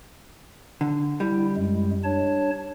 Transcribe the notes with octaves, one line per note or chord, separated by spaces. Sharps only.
D3
G3 E4
F#2 G#3
D4 C#5 A5